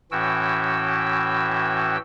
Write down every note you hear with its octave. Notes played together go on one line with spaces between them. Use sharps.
A2 E3 C#4 F#4 G5 E6